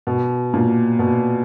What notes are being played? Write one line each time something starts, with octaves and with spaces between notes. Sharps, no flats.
B2
A#2
B2